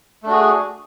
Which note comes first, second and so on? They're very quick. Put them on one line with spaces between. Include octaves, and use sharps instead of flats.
A3 D4 F#4 G#4